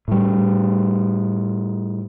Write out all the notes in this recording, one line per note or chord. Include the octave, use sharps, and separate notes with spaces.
A2 G3